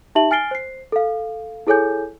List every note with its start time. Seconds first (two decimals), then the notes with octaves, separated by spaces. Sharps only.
0.15 D#4 G4 E5 A5 F#7
0.31 G#5 F6 A6 C7 D7 G7
0.51 C5 C7
0.92 A4 F5
1.67 E4 G#4 A4 C#5 G#5 G6